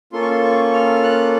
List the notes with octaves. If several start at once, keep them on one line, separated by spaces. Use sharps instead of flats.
A#3 C#4 F4 A4 C6
C#6
C6
C#6
F6
F#6